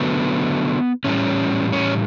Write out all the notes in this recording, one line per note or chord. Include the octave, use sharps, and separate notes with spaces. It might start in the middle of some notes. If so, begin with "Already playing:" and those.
Already playing: D3 F#3 A3 B3
A2 E3 G3 C#4
C#4